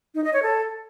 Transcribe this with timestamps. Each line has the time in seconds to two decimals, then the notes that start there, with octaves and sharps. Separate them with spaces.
0.15 D#4
0.24 D#5
0.33 C#5
0.43 A4